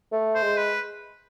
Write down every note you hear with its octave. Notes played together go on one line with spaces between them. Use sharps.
A3
C5
G#3
B4